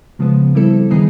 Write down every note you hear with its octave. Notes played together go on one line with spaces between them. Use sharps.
C#3 F3 G#3 B3
G3 C4 E4 A4
D#3 G3 B3 D#4 G#4